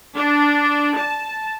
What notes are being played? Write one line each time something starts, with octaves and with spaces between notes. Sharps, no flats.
D4
A5